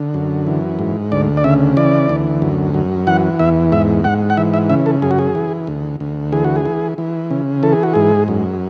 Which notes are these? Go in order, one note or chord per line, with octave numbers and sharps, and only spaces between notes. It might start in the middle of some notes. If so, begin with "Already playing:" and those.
Already playing: D3
F#2
E3
G#2
D2 D5
D5
C#3 E5
E3 D5
D2
F#2
F#2
E3 F#5
E2 E5
G#2 E5
G#2 F#5
F#5
E3 E5
E5
C#3 E5
A4
F#2 G#4
F#4
G#4
E3
D2
D2
E3 G#4
F#4
G#4
E3
E3
C#3
E3 A4
G#4
F#4
G#2 G#4
F#2